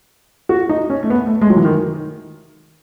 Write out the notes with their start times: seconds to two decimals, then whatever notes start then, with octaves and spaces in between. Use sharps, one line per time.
0.49 F#4
0.69 D#4
0.90 C#4
1.03 A3
1.10 B3
1.26 A3
1.41 G#3
1.50 F#3
1.56 E3
1.65 D#3